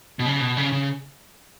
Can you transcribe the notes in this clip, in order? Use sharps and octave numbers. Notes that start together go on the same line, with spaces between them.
B2
C#3
B2
C#3
C#3